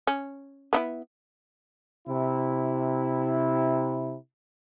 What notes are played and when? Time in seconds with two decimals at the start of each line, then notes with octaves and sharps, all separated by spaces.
0.07 C#4
0.73 B3 D#4 E4
2.08 C3 E4